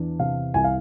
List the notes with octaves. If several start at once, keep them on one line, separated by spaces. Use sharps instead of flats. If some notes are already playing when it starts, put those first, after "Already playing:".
Already playing: E2 D4
C3 F5
C2 G#5
F5